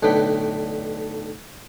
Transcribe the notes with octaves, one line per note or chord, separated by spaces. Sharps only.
B1 A2 D3 B4 G5